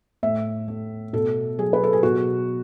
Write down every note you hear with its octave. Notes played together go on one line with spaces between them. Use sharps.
A2 E5
A3
B2 A4
F#3 G#4
B4
A4
G#4
B2 F#4